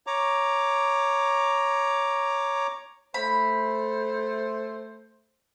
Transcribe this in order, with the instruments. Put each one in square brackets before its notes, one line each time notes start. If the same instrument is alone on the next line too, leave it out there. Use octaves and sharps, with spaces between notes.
[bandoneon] C#5 A#5 D6
[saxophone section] A3 C5 [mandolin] B5